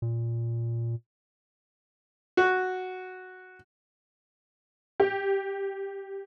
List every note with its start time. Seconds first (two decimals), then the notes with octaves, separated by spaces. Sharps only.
0.02 A#2
2.37 F#4
5.00 G4